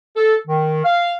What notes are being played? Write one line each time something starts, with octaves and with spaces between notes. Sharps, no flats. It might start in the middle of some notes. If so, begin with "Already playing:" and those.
A4
D#3
F5